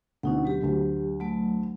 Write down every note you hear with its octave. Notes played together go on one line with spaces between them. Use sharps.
D2 B2 C#4 D#4 F#5
F#3 G4
D2
F#3 A3